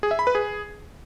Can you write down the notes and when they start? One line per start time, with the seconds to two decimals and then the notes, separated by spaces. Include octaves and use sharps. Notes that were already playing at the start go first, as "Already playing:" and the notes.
0.03 G#4
0.11 E5
0.19 B5
0.27 B4
0.35 G#4